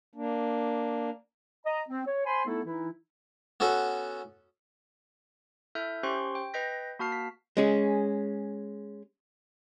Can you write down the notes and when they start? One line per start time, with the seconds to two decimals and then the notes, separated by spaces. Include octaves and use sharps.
0.15 A#3 D4
1.66 D#5 A#5
1.89 C4
2.07 C#5
2.26 C5 G#5 B5 C6
2.46 A3 B3 D#4 E4 A4
2.65 E3 D#4 E4
3.60 B3 C#4 F#4 A4
5.75 E4 A4 E5 F6 G6
6.03 C#4 G4 C5 G5 C6 C#6
6.35 G5
6.54 B4 D#5 G5 G6 A#6 B6
6.99 A#3 F#4 A5 F6 C7
7.12 B6
7.57 G#3 C#4 G#4